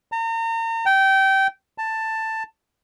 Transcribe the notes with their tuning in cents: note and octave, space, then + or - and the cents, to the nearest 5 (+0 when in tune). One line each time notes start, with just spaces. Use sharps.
A#5 -40
G5 -20
A5 +10